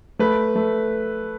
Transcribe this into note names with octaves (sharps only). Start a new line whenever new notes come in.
A3 B4
A3